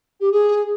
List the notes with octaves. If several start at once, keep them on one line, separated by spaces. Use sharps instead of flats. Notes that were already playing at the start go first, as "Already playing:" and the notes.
G4
G#4